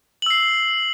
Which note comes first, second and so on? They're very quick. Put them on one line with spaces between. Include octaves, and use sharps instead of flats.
F#7 E6 C7